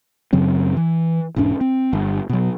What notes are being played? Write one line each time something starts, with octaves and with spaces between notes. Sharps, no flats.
F#2 C#3 F#3 C4
E3
E1 G#2 C#4 D4
C4
G1
B2 F#3